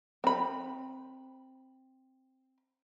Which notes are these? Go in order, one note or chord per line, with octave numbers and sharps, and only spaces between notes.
C4 B5